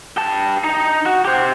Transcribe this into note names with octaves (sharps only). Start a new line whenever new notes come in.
G4 A5
D#4
F#4
G4 C5